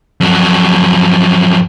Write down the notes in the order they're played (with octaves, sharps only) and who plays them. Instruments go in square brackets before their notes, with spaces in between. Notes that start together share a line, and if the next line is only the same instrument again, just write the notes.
[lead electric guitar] F2 F#3